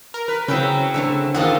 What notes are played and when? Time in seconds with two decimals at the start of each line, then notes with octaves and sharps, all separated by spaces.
0.14 A#4
0.28 B4
0.48 C#3 F#3 C4 E4 B4 G5
0.94 D3 A3 C4
1.34 D#2 G#2 A#3 C4 D#4 F4 F#5